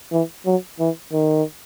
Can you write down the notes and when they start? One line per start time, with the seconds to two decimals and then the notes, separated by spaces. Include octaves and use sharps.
0.12 E3
0.46 F#3
0.80 E3
1.12 D#3